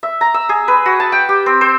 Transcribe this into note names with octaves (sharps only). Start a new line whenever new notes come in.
E5
A#5
E6
G#4
B4
F#4
A5
G5
G4
C4
C5